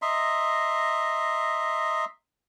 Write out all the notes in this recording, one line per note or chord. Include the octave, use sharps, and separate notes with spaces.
D#5 E5 A#5 C6